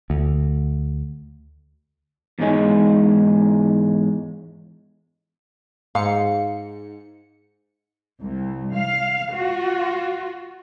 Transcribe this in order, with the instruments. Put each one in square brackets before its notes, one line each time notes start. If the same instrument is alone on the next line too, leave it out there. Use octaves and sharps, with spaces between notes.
[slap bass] D2
[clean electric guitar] E2 G#2 G#3 C#4
[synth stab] G#2 C#7 [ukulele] F5
[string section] C2
F5
F4 F#4